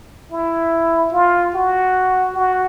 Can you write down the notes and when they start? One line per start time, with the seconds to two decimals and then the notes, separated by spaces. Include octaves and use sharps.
0.32 E4
1.13 F4
1.55 F#4
2.36 F#4